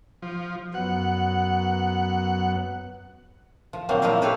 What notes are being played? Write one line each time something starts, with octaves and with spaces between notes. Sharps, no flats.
F3
F#2 F#3 B3 F#5
F3
A#2 D#3 F3 F#3 A#3 C4
F3 A#3 D#4 E4 A#4 F5
G4 A4 B4 C#5 D5 F5